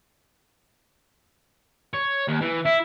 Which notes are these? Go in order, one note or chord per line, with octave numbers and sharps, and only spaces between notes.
C#5
D#2
E3
E4 E5